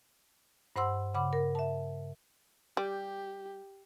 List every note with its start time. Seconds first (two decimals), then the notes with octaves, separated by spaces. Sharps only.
0.76 G2 C5 F#5 C6 E6
1.14 C#3 F#5 B5 D6
1.33 A#4
1.55 E5 A5
2.77 G3 G4